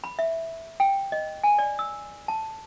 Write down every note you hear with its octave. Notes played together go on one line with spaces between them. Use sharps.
B5
E5
G5
D#5
G#5
D5
E6
A5